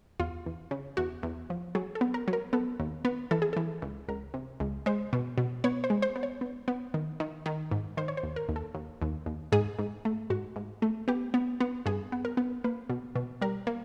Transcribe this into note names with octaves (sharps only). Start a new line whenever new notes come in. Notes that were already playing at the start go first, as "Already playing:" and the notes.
E2 F4
E2
C#3
E2 F#4
E2
F3
F#3 G#4
A4
B3
A#4
F#3
A#4
B3 A4
D#2
B3
E3 A4
G#4
E3 A4
C#2
C#2 A#4
C3
C#2
G#3 C5
B2
B2
B3 C#5
C5
G#3
C5
B3
C#5
B3
B3
D#3
D#3
D#3
G#2
D#3 C5
C#5
C5
D#2
A#4
D#2
A4
D#2
D#2
D#2
G#2 G#4
G#2
A3
G#2 F#4
G#2
A3
B3 G4
B3
B3
G2 G#4
B3
A#4
B3
A#3 B4
B2
B2
G3 A#4
A#3